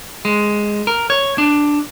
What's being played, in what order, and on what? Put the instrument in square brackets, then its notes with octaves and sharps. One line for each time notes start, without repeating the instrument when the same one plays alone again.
[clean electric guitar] G#3
A#4
C#5
D4